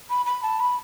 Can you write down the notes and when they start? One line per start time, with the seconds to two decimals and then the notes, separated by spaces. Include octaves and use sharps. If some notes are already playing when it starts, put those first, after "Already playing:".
0.10 B5
0.26 B5
0.43 A5
0.60 B5